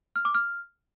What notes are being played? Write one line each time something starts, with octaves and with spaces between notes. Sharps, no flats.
F6
D6
F6